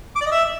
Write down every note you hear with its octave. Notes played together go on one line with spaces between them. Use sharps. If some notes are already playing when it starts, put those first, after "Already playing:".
D6
D5
D#5
E5